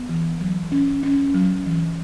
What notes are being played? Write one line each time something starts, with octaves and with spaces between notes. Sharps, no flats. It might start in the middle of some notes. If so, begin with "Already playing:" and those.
Already playing: B3
E3
F#3
C#4
C#4
F#3
E3